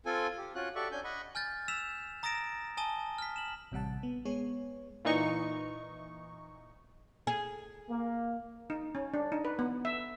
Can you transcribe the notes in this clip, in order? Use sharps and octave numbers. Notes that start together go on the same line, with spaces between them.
C4 F4 A4 G#5
G4
C#4 F4 F#4 F#6
F#4 G4 A4 D5 E5 C#6
C#4 D4 G#5 G6
D#5 F#5 B5 C#6
G#5 F6 G6 A6
E6 B6 E7 F7
A#5 D#6 A6 A#6 D7 E7
G#5 A5 D#6 G7
F6 B6
E7 F#7
A1 C3 G3 F#5 A5
B3
G#3 B3 G#4 C#5
A#2 E3 D#4 C#6
G#4
A#3
D#4
C#4
D4
D#4
B4
B3
E5